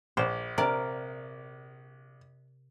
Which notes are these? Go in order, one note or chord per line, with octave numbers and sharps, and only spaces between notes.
A#1 C5
C3 A#4 D5